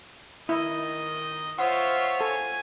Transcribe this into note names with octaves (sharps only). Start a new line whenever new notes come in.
D#3 E4 D#5
F4 C5 C#5 E5 F#5 D#6
A4 G#5